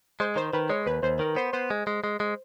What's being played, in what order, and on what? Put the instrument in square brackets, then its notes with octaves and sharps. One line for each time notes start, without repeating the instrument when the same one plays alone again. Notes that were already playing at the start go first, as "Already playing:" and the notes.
[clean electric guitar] G#3 [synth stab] C5
[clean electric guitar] D#3 [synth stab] C5
[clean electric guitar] D#3 [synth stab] B4
[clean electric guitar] G#3 [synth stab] C#5
[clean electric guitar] D#2 [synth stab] B4
[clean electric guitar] D#2 [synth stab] C5
[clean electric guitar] D#3 [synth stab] A#4
[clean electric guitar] B3 [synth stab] C5
[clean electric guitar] B3 [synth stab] C5
[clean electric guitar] G#3
G#3
G#3
G#3